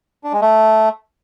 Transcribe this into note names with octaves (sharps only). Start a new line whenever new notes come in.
D4
G#3
A3